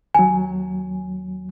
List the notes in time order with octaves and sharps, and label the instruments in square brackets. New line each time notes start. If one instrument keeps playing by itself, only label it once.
[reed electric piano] D#2 F#3 [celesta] G#5